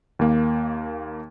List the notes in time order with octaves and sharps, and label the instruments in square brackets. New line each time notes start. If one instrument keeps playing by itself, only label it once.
[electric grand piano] D#2 A#3